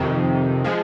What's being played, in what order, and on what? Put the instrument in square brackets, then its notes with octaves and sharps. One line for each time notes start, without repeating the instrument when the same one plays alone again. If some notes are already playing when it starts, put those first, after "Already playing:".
Already playing: [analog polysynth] F2 C3 D#3
F3 G#3